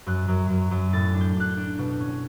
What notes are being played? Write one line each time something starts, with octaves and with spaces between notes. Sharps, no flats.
F#2 F#6
F#2
F#2
F#2
A2 A6
D4
G6
D4 F#6
G6
D4
B2
C#4